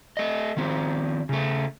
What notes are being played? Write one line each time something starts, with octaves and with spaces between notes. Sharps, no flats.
A3 D#5
D#3 F3 C4
C#3 A3